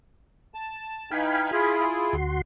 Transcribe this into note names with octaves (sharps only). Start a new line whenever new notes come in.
A5
E3 D#4 F5 G5 G#5 B5
E4 F4 G#4
D2 F#4 C6